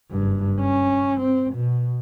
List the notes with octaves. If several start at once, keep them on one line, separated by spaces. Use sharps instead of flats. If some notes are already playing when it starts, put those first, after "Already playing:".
F#1 G2
C#4
C4
B2